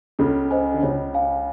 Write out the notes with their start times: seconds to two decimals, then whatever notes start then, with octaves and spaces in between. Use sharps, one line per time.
0.19 C#2 C#3 A4
0.51 C5 D#5 G#5
0.74 D3
0.83 C#2 C#3 C#5
1.14 F5 G#5